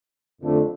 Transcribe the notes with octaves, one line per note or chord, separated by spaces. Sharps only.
F2 D3 A3